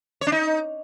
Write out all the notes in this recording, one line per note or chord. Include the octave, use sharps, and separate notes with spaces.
C#5
D4
D#4